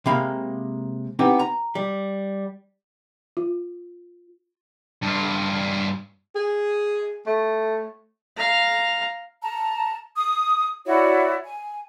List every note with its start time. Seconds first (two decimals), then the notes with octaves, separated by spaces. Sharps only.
0.06 C3 G#3 A#3 A#4 F5 B5
1.19 B3 C4 D#4 E4 G4
1.39 A#5
1.75 G3
3.37 F4
5.02 G2 F4
6.36 G#4
7.27 A3
8.37 F5 A#5
9.42 A5 A#5
10.16 D#6
10.86 E4 F#4 C#5 D5
11.44 G#5